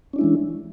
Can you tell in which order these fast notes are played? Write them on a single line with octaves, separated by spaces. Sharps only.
C#4 D4 E4 G#3 E3